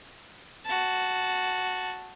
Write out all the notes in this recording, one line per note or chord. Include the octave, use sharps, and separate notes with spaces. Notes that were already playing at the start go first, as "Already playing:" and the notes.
F#4 A5